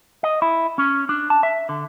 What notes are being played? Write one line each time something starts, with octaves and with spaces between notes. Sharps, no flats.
D#5
E4
C#4
D4
A5
E5
D3